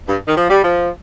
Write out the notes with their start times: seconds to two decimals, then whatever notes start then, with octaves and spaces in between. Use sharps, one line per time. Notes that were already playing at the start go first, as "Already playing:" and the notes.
0.09 G2
0.28 D#3
0.36 F3
0.50 G3
0.64 F3